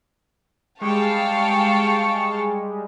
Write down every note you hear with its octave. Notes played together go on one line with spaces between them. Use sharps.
G3 G#3 F5 G5 A5 C#6